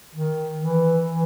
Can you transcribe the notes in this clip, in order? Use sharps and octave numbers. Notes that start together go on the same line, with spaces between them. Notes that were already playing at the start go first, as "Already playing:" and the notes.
D#3
E3
E3